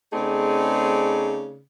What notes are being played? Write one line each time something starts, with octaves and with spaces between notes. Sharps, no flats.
C#3 A3 C4 D#4 G#4 D5